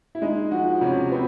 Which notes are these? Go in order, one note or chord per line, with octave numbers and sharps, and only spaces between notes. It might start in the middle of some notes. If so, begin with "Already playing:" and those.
E4
G#3 D#4
F3 F#4
C3 C#4
B3 C4